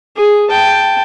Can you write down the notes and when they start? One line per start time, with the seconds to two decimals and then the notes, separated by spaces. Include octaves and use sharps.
0.16 G#4
0.49 G5 A5